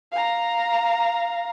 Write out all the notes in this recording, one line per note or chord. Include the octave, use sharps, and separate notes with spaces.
F5 A#5